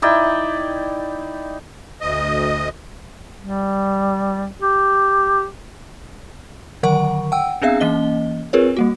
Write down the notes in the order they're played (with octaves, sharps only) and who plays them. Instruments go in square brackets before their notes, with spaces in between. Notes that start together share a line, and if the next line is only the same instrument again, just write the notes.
[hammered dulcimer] D#4 E4 D5 G5
[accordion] D2 D#5
[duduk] G3
G4
[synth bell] D3 D#3 F#3 A#4 F#5 C#6
F#5 G5 E6
B3 C4 D4 G#4 E5 F5
E3 A#3 C#4 D#5 G7
C4 F4 G#4 A#4 B4 C#5
G3 A#3 F#4